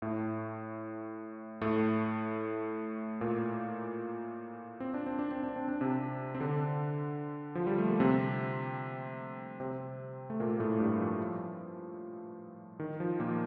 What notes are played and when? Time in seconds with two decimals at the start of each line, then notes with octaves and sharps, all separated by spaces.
0.02 A2 A3
1.62 A2 A3
3.21 A#2 A#3
4.80 C4
4.94 D4
5.06 C4
5.19 D4
5.31 C4
5.43 D4
5.56 C4
5.68 D4
5.81 C3 C4
6.35 C4
6.40 D3 D4
7.55 F3
7.67 G3
7.78 A3
7.89 A#3
8.00 C3 C4
9.60 C3 C4
10.30 A3
10.40 A#2 A#3
10.60 A2 A3
10.80 G2 G3
11.00 F3
12.80 D#3
13.00 F3
13.20 A#2 A#3